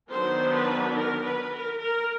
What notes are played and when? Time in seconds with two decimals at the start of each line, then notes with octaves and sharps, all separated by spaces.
0.11 D#3 F#3 B3 D4 C5
0.54 B4
0.96 A#4
1.24 B4
1.52 A#4
1.80 A#4